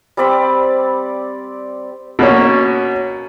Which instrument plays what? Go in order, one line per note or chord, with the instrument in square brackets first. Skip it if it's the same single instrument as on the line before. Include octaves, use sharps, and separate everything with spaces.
[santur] G3 C4 D5 B5
[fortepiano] B2 A#3 C#4